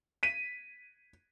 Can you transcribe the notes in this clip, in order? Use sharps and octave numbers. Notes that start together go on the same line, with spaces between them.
B6 D#7